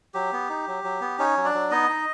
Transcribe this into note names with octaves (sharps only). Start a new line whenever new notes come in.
F#3 G4
B3
D#4
F#3
F#3
B3
C#4 D#4 C#5
F#3
D4 D5
F#3
B3 D#4 D#5
D#4